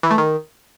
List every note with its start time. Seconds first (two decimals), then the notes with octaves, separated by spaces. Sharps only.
0.03 E3
0.11 A3
0.18 D#3